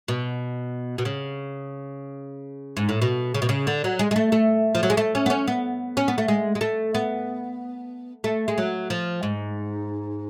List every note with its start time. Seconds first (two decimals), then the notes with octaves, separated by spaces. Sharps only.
0.08 B2
0.98 B2
1.05 C#3
2.77 G#2
2.89 A2
3.02 B2
3.34 C#3
3.42 B2
3.49 C#3
3.67 D3
3.84 F#3
3.99 G#3
4.11 G#3
4.16 A3
4.32 A3
4.75 F3
4.83 F#3
4.90 G#3
4.97 A3
5.15 C#4
5.26 B3
5.30 C#4
5.48 B3
5.97 C#4
6.08 B3
6.18 A3
6.28 G#3
6.55 G#3
6.61 A3
6.95 B3
8.24 A3
8.48 G#3
8.58 F#3
8.90 F3
9.23 G#2